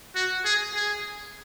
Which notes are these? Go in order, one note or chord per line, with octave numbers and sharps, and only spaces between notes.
F#4
G#4
G#4